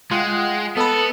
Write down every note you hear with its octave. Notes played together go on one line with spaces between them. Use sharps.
G#3 F4 F#5 G5
B3 A4 B4 D#5